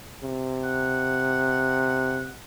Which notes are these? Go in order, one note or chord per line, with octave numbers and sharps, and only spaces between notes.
C3
F#5